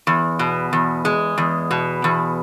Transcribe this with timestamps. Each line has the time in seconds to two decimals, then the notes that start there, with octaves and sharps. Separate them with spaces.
0.07 E2
0.39 B2
0.73 E2
1.05 G#3
1.38 E2
1.71 B2
2.04 E2